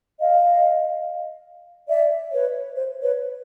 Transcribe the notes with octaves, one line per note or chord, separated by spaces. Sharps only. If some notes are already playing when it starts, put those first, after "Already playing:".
D#5 F5
D5 E5
B4 C#5
C5
B4 C#5